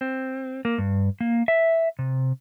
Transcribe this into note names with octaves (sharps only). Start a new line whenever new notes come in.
C4
A#3
G2
A#3
E5
C3